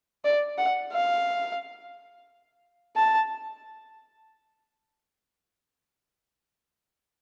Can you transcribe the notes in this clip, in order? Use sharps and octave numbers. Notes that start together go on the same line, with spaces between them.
D5
F#5
F5
A5